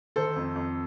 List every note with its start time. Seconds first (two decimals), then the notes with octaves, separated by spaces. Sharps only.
0.16 D#3 A4 C5
0.36 F2
0.56 F2